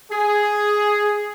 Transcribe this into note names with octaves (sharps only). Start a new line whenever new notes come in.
G#4